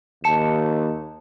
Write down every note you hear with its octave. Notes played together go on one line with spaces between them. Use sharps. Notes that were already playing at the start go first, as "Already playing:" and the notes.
D#2 A5 C#7 E7